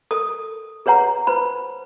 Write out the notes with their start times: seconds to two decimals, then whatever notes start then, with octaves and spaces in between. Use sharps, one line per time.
0.11 A4 A#4 D#6
0.86 G#4 B4 C#5 F#5 A#5
1.27 B4 C5 B5